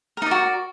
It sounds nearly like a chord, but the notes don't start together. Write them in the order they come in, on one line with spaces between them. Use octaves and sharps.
A#4 D#4 D5 F#4